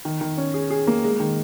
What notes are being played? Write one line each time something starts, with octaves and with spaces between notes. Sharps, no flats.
D#3
D#3
C#4
G#4
G#4
A#3
G#3
D#3